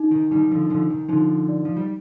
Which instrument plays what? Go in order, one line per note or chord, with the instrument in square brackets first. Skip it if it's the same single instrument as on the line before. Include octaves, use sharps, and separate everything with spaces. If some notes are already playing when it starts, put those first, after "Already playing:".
Already playing: [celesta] D#4
[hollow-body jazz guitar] D#3
[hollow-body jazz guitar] D#3 G3 [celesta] D#4
[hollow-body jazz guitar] D3 F3
[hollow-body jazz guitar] D3 F3 [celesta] D#4
[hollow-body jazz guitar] D#3
[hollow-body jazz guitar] D3 F3 [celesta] D#4
[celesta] D5
[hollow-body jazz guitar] F3
G3